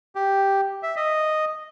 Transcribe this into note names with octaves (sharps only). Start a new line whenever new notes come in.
G4
E5
D#5